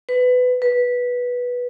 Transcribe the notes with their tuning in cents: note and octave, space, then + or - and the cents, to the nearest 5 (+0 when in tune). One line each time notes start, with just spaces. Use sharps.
B4 +20
B4 -10